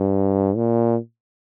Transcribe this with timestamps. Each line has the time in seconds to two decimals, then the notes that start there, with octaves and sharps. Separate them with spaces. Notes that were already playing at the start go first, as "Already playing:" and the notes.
Already playing: G2
0.56 A#2